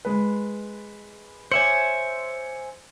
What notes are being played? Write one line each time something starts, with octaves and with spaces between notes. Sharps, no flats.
G#3 B4
C5 C#5 E5 G#5 D6 C#7 F#7